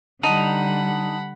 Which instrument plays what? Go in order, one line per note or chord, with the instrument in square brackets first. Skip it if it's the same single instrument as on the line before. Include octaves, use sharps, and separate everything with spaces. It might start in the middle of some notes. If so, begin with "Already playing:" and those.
[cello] D3 G3 [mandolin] D#4 [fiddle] F#5 B5 [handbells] A5